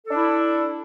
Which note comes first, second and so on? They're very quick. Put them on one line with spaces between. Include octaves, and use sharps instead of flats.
A4 D4 E4